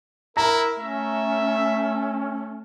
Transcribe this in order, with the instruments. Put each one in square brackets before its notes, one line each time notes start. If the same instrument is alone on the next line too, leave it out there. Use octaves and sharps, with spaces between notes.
[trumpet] E4 [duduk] A#4 [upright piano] A#5
[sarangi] A3 [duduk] C#4 [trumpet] E5